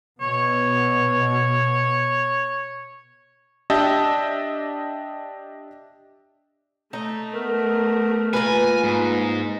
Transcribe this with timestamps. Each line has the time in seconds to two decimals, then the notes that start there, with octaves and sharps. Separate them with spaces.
0.21 B2 C#5
3.70 D4 G4 D#5 E5 A5
6.93 A3 D#4
7.34 B3 A#4
8.33 A#3 F4 A#4 B4 G#5
8.83 G#2